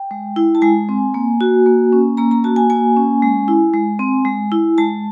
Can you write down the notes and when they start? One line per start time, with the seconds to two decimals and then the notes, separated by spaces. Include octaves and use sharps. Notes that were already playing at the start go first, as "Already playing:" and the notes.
Already playing: G5
0.11 G#3
0.36 E4
0.55 A5
0.62 G#3 G#5
0.89 C4
1.14 A#3
1.41 F#4
1.66 A#3
1.92 C#4
2.17 A#3 A#5
2.31 A#5
2.44 F#4 A5
2.56 G#5
2.70 A#3 G#5
2.96 C#4
3.22 G#3
3.48 E4
3.74 G#3
3.99 C4
4.25 G#3
4.52 E4
4.78 G#3 A5